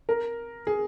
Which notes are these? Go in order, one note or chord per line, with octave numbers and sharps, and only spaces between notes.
A#4
G#4